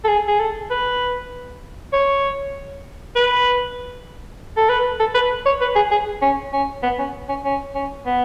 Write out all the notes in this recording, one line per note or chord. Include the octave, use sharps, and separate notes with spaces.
A4
G#4
G#4
A4
B4
C#5
B4
A4
B4
A4
B4
C#5
B4
G#4
G#4
C#4
C#4
B3
C#4
C#4
C#4
C#4
B3